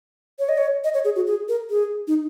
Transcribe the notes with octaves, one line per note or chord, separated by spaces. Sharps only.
C#5
D#5
C#5
D#5
C#5
G#4
F#4
G#4
A#4
G#4
D#4